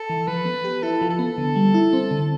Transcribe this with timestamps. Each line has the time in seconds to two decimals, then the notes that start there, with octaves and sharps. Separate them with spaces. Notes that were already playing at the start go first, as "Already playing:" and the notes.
Already playing: A4
0.10 E3
0.27 F3 B4
0.45 B3
0.64 G4
0.83 E4 A4
1.01 F3
1.10 A4
1.19 B3
1.38 D3
1.56 G3
1.74 E4
1.93 C4
2.11 D3